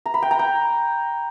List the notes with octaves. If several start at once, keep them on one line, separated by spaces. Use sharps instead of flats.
A#5
B5
G5
A#5
G5